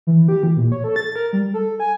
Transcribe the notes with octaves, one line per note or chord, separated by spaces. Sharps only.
E3
G4
E3
A#2
C#5
A4
A6
A#4
G3
A4
G#5